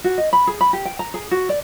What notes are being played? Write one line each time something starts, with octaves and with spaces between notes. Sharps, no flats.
F#4
D#5
B5
G#4
B5
G4
G5
A#5
G#4
F#4
D5